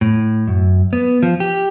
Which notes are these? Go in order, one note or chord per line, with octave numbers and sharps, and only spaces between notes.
A2
F#2
B3
F3
G4